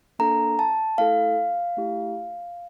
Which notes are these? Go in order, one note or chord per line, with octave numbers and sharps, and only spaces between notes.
A#3 D4 A4 A#5
A5
A3 E4 A4 F5
A3 E4 G4